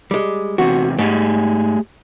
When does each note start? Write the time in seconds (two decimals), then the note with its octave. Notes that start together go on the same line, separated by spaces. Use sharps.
0.11 G3 G#3
0.58 E2 C3 F#4
0.99 G#2 A3 G4 G#4